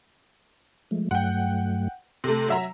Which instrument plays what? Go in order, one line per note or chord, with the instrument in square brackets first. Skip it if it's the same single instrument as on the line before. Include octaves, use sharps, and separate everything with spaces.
[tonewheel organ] F3 G#3 A3
[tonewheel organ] G2 F#3 A3 [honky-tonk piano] F#5 G5
[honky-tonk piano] C3 A3 [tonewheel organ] A4 C6
[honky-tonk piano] F#3 E5 A#5